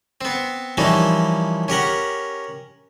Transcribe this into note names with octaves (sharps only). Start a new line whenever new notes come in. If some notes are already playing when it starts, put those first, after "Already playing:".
B3 C4
E3 F3 G3 A#3 C#4 D#4
C#4 G4 A#4 F#5